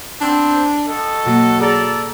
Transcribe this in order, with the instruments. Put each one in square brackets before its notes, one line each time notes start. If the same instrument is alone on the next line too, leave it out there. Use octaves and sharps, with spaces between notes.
[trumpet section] B3 C4 [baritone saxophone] D4
[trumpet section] F#4 A4 D#5
[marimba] B2 A#3 [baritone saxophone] F#3
[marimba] G#4 [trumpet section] A4 D5 A#5